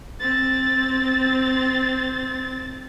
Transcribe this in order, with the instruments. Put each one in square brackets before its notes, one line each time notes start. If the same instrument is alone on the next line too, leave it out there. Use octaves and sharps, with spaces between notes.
[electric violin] C4 A6